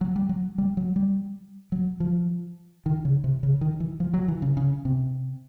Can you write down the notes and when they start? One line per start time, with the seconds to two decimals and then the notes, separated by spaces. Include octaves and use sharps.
0.01 F#3
0.16 G3
0.29 F#3
0.58 G3
0.77 F#3
0.96 G3
1.72 F#3
2.00 F3
2.86 D#3
3.05 C#3
3.24 C3
3.43 C#3
3.61 D#3
3.80 E3
4.00 F3
4.13 F#3
4.28 E3
4.42 C#3
4.57 C#3
4.85 C3